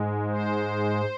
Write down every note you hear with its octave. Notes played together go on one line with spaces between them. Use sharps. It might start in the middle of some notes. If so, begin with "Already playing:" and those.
Already playing: G#2 G#3
C5